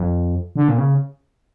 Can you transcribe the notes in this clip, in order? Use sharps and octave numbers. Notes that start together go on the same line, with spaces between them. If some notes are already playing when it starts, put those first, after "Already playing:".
Already playing: F2
D3
A#2
C#3